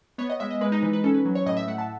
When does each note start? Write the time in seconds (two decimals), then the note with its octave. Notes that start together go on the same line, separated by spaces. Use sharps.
0.18 B3 C#5
0.30 D#5
0.40 G#3 E5
0.51 D#5
0.61 G#3 B4
0.72 D#4
0.82 E3 B4
0.93 B4
1.04 C#4 A4
1.14 B4
1.25 F#3
1.35 C#5
1.46 A2 D#5
1.57 E5
1.68 A3 F#5
1.78 A5